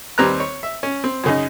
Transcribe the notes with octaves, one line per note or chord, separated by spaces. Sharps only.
D#2 G3 C4 B4 A#5 F#6
C#5
E5
C#4
C4
F#2 C#3 D#4